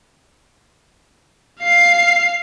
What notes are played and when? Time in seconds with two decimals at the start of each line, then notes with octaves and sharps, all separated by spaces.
1.61 F5 C7